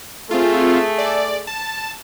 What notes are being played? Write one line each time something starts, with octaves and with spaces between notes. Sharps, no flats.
A3 C4 F4 G#4
D5
A5